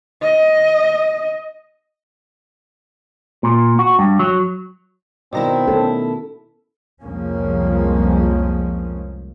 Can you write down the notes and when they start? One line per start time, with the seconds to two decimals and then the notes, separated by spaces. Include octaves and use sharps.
0.22 D#5
3.43 A#2
3.79 F#4
3.99 G2
4.19 F#3
5.33 B2 D#3 C4 E4 D5 D#5 A#5
5.68 C#4 A4
7.03 C2 F2 F3 G#3 A#3 C#4